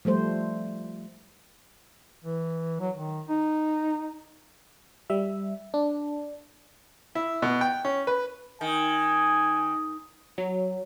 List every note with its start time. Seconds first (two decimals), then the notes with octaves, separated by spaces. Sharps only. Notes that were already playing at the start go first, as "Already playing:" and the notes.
0.05 F3 G3 A3 C5
2.24 E3
2.80 F#3
2.96 D#3
3.29 D#4
5.10 G3 E5
5.74 D4
7.15 E4
7.42 B2
7.61 G5
7.85 C#4
8.07 B4
8.61 D#3 G#5
10.38 F#3